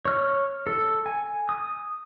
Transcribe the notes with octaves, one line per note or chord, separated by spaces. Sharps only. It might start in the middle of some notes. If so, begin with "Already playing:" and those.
C#5 F6
A4
G#5
D#6